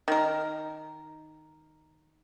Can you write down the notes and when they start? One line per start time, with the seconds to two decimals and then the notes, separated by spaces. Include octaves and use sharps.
0.08 D#3 A#4